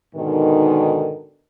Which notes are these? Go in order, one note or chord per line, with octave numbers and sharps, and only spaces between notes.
G#2 B2 D3 D#3